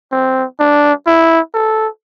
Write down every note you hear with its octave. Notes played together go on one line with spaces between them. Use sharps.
C4
D4
E4
A4